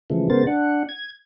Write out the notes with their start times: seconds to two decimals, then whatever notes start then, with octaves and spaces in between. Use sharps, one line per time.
0.10 C#3 E3 F3 G#3 A3
0.30 C#3 G#3 B3 A#4 C5 A6
0.47 D4 F#5
0.89 G#6